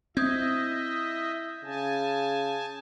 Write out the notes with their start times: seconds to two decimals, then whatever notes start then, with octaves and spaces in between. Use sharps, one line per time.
0.17 C4 E4 D#5 E5 D#6 G6 G#6
1.64 C#3 G#5 A5